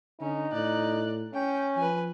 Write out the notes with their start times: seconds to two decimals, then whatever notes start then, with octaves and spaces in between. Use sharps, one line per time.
0.21 D3 C#4 D#4
0.53 A2 D5 F#6
1.34 C#4 G5
1.77 F3 B4 G#5